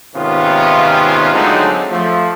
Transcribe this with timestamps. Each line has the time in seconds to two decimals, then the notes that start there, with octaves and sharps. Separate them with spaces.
0.15 G#2 C3 D#3 B3 C#4 F4
1.34 D3 F#3 G#3 A3 C4 D#4
1.91 F3 A3